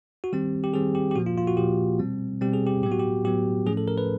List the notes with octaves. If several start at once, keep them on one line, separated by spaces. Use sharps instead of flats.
F#4
D#3 G3 C4 G4
G4
D#3 G3 C4 G#4
G4
G4
A#2 F3 A#3 F#4
F4
F4
F#4
A#2 F3 A#3 G4
B2 G3 C4
B2 G3 C4 G4
G#4
G4
A2 F#3 B3 G4
F#4
G4
A2 F#3 B3 G4
A2 F3 A3 C#4 G#4
A4
A#4
B4